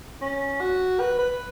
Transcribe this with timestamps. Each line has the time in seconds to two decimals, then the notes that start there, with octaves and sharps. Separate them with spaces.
0.21 C#4
0.60 F#4
1.00 B4
1.18 B4